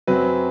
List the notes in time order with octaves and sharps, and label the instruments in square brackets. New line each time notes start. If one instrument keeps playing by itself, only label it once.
[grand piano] F#2 F#3 C4 B4